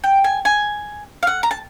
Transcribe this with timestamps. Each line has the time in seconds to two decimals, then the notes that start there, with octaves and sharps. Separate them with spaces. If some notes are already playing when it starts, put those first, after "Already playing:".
0.04 G5
0.24 G#5
0.45 G#5
1.23 F5
1.27 F#5
1.43 A#5
1.51 A5